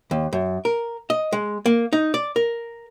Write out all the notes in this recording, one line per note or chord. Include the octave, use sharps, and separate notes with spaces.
D#2
F#2
A#4
D#5
G#3
A#3
D#4
D5
A#4